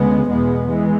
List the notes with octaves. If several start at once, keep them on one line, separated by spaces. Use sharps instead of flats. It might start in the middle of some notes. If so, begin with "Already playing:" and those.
Already playing: D2 C#3 G#3 B3
E2 B2 G#3 B3
E3 G#3